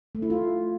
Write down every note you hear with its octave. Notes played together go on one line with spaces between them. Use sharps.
A3
E4
F4